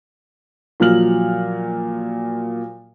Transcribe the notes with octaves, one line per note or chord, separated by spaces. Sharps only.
A#2 F3 F#3 F6 F#7